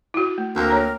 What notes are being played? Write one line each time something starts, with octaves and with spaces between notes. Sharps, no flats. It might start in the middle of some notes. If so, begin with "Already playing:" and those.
E4 F#4
A3
D2 A#3 C4 A#4
C#5 A#5